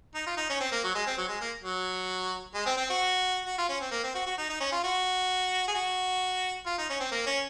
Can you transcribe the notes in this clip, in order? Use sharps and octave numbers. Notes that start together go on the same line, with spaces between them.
D#4
F4
D#4
C#4
C4
A#3
F#3
G#3
C4
F#3
G#3
A#3
F#3
G#3
C4
C4
F#4
F#4
F4
C#4
C4
A#3
C4
F#4
F#4
D#4
D#4
C#4
F4
F#4
G#4
F#4
F4
D#4
C#4
C4
A#3
C#4